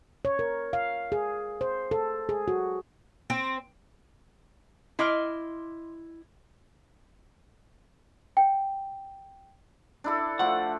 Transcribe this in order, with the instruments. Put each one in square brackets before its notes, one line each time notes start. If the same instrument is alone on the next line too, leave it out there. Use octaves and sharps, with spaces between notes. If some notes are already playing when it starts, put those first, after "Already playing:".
[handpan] C#5
A#4
F5
G#4
C5
A4
G#4
F#4
[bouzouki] C4
[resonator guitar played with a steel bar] E4 D#5 [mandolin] C6 D6 F6
[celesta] G5
[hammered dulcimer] D4 E4 A4
[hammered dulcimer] F3 A3 [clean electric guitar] F#5